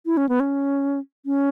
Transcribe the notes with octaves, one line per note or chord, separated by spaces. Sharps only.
E4
C#4
B3
C#4
C#4